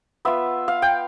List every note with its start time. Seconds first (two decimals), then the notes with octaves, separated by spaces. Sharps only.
0.25 B3 F4 E5
0.68 F5
0.82 G5